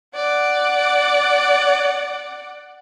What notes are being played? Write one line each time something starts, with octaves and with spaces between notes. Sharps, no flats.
D5 F#5